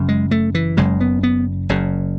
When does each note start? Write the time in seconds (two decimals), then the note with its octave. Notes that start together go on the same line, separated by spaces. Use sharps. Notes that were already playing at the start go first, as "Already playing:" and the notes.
Already playing: F#1 F#2 C#3
0.09 G#3
0.31 A3
0.55 E3
0.77 F#1 F#2 C#3 G#3
1.01 B3
1.23 B3
1.69 F#1 F#2 C#3